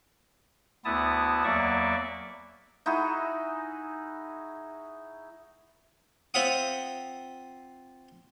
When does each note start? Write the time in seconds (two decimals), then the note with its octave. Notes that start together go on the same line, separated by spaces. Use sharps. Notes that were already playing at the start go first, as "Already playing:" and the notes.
0.85 D2 B3 E4 A5 D#6
1.44 E2 F#3 A#3 D5 E5 C#6
2.86 D#4 E4 F#4 G#4
6.34 C4 F4 E5 F#5 D#6